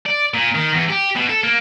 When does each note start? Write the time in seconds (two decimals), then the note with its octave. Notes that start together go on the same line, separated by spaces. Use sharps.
0.06 D5
0.34 A#2
0.55 D#3
0.74 E2
0.89 G4
1.16 B2
1.29 A4
1.43 A#3